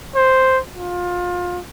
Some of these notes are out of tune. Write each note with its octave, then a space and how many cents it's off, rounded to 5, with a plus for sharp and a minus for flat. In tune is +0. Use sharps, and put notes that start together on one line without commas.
C5 +0
F4 +25